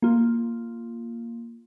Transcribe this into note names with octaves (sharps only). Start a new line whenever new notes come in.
A#3 F4